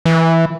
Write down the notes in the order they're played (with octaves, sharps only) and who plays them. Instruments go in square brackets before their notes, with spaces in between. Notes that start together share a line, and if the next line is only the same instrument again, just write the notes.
[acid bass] E3